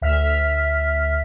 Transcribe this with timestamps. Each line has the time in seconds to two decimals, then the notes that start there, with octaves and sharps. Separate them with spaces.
0.02 D2 E5 F6 B6